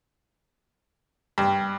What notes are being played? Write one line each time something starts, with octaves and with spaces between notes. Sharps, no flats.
G2